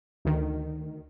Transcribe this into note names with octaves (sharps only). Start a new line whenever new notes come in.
D2 D#3